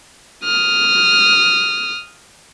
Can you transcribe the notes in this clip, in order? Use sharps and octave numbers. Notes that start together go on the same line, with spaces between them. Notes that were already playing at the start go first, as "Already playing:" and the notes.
D#6 F6